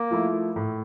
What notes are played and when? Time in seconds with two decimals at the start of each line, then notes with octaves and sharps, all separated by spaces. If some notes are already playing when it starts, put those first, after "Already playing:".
Already playing: A#3
0.11 F3 A3 E4
0.56 A2